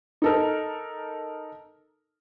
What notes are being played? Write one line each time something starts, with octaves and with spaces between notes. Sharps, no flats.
D#4 A4 A#4